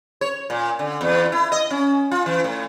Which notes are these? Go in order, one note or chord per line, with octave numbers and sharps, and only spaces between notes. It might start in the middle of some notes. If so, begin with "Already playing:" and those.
C#5
A#2
D3
E2
E4
D#5
C#4
F4
E3
A2